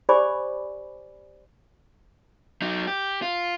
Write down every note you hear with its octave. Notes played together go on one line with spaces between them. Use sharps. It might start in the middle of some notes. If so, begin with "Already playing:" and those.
G4 C5 D5 G#5 B5 D6
F#3 D#4
G4
F4